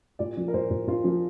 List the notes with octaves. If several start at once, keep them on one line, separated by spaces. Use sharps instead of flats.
A#2 D5
F3
A#4
A#2 C5
A#2
A#2 F4
F3